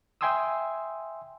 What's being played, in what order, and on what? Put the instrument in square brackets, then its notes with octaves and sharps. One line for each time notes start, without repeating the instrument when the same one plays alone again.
[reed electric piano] E5 G5 G#5 C6 D#6 E6